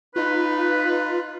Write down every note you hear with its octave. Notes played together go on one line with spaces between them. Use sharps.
D#4 F4 B4